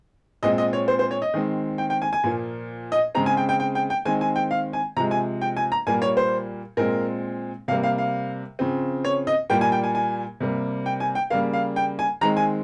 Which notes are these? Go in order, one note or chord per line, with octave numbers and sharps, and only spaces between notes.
A#2 G#3 C4 D#5
D#5
C#5
C5
C5
C#5
D#5
D#3 G#3 C4
G5
G5
G#5
G#5
A#2 F3 A#3
D#5
C#3 G#3 C4 A#5
G#5
G5
G5
G5
G5
G5
D#3 G#3 C4 G#5
G#5
G5
F5
G#5
C3 F3 G#3 A#5
G#5
G5
G#5
A#5
A#2 G3 A#3 G#5
C#5
C5
A#2 G#3 C4 A#4
C3 G3 A#3 F5
F5
F5
C#3 F3 C4
C#5
D#5
A#2 G3 A#3 G5
G#5
G5
G#5
G#5
C3 G3 A#3
G5
G#5
G5
C#3 G3 A#3 F5
F5
G5
G#5
D#3 G#3 C4 A#5
G#5